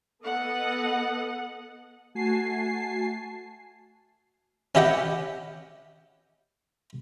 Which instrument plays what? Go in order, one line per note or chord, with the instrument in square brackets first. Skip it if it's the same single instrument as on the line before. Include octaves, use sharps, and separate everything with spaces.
[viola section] B3 A4 D#5 [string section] F#5
[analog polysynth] A3 F#4 G#5 A5 C7
[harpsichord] C#4 E4 G4 D#5 F#5 G5